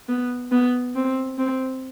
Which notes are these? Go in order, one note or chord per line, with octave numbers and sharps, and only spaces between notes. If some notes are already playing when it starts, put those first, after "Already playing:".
B3
B3
C4
C4